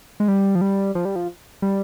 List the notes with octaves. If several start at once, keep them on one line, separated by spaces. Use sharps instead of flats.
G#3
G3
F3
G3
F3
G3
F3
G3